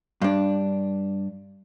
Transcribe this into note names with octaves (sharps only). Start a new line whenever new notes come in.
G2 D4